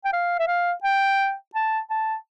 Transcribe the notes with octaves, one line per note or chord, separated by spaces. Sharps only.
G5
F5
E5
F5
G5
A5
A5